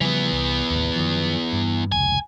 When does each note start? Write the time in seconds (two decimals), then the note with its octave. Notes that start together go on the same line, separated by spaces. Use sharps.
0.01 C#3 E3 F3 G3 B3
0.32 C2
0.71 A1 D#2
0.96 F#2 D#3 F3
1.53 G2
1.92 F1 C#2 G#5